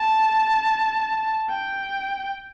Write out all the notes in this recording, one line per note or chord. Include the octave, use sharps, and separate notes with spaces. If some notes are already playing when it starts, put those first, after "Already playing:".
Already playing: A5
G5